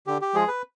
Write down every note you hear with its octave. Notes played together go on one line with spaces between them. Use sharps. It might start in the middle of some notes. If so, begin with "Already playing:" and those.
D3 G4
G4
F3 G#3 G#4
B4